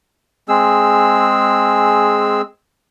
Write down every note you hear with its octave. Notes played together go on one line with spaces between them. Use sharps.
G#3 C4 G#4 E6